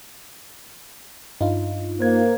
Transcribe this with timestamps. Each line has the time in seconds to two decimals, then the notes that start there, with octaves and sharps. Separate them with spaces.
1.41 G2 D#4 F4
2.00 A#3 C5 G#6